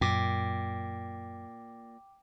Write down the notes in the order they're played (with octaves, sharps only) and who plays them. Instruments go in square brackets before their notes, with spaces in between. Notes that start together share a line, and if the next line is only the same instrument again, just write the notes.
[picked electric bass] F#2 [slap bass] A#2 [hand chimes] G5 D6